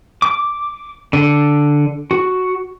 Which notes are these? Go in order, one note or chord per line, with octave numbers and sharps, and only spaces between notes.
D6
D3
F#4